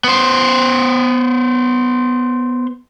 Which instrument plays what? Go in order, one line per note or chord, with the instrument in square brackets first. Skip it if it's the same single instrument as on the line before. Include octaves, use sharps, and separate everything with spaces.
[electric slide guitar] B3 C5